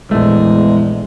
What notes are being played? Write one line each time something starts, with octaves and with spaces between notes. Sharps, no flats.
A#1 E2 G#3 A3